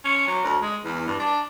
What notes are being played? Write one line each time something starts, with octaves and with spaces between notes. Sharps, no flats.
C#4
F#3
D2
G#3
E2
G2
D4